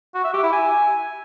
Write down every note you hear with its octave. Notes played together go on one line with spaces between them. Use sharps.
F#4
E5
G4
E4
G#5